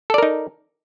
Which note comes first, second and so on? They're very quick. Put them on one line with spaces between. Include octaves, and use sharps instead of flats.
A4 D5 A#4 D#4